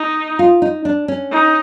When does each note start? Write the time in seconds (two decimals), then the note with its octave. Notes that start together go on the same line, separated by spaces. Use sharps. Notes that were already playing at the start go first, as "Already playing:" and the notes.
Already playing: D#4
0.39 F4
0.62 D#4
0.85 D4
1.08 C#4
1.31 D#4